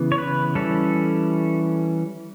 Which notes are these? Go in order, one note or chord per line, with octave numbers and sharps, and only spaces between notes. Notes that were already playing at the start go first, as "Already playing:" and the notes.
Already playing: C#3 E3 B3
C#5
B4
E3 G3 C#4 A4